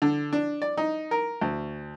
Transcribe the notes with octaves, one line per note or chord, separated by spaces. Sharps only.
D3
D4
D5
D#4
A#4
D2